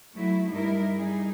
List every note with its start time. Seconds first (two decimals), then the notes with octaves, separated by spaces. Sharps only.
0.15 F#3 A3 E4
0.50 G2 G3 D#4 E4 A#4
0.96 G3 D#4 G#4